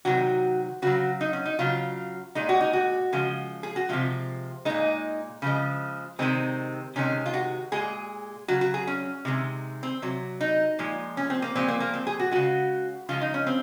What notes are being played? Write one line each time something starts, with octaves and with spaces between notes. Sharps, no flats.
C3 D#3 F#3 F#4
C#3 F#3 F#4
D#4
C#4
D#4
C#3 F#3 F4
A#2 G#3 D#4
F#4
D#4
F#4
C#3 F3 G#3
G#4
F#4
C3 F3 G#3 F4
A#2 G#3 D#4
C#3 F3 G#3
C3 D#3 G#3 C4
C3 D#3 G#3 C#4
F4
F#4
A#2 G#3 G#4
C#3 F#3 F#4
F#4
G#4
C#4
C3 D#3 G#3
C4
C3 F#3
D#4
A#2 F3 G#3
C#4
C4
A#3
A#2 F3 G#3 C4
A#3
A#3
C4
G#4
F#4
C#3 G#3 F#4
C#3 F3 G#3 F4
D#4
C#4
C4